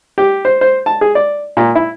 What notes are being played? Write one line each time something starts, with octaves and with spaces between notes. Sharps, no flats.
G4
C5
C5
A5
G#4
D5
A#2
E4